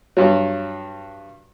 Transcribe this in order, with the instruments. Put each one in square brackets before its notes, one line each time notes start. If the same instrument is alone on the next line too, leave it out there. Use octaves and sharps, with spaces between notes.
[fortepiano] G2 F#3